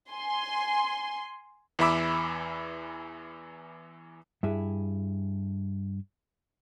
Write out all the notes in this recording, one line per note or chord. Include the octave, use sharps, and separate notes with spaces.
G#5 C6
E2 E3 E5 B5 D6 E6
G2 E4 G#4